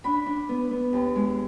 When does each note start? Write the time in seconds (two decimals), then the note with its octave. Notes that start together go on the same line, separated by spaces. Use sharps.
0.04 D4 B5
0.27 D4
0.49 B3
0.71 B3
0.93 D#2
1.15 G#3